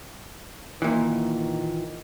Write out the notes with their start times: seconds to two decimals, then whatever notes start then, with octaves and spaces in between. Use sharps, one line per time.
0.82 A#2 D#3 E3